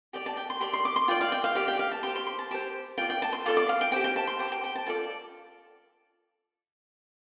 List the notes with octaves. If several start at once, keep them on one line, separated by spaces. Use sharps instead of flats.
G4 D5 G5
A5
G5
C6
G4 D5 C6
C6
D6
C6
F4 D5 G5
F5
G5
F5
G4 D5 F5
G5
F5
A5
G4 C5 C6
C6
C6
A5
G4 C5 A5
F4 D5 G5
G5
A5
C6
F4 A4 D5 D6
D6
F5
G5
G4 C5 G5
G5
A5
C6
G4 C5 D6
G5
G5
A5
F4 A4 D5 A5